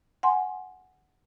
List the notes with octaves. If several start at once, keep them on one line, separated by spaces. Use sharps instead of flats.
F#5 G#5 C6